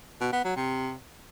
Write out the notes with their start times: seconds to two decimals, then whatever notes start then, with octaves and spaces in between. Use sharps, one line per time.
0.21 B2
0.33 B3
0.44 F#3
0.56 C3